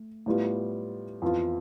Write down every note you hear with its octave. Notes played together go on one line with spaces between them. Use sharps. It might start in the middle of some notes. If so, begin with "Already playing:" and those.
Already playing: A3
A2 G3 B3 F4
F2 E3 B3 F4